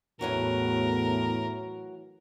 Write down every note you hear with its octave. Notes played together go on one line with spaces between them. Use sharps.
E2 A2 E3 F#3 F#4 A#4